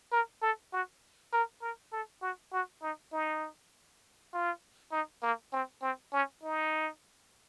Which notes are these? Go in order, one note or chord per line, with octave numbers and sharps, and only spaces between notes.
A#4
A4
F#4
A#4
A#4
A4
F#4
F#4
D#4
D#4
F4
D#4
A#3
C4
C4
C#4
D#4